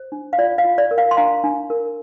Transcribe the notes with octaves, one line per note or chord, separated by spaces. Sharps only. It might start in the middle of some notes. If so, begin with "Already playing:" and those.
Already playing: C5
D4
F5
F4 D5
F5
F4
D5
A#4
F5
C6
D4 F5 A#5
D4
A#4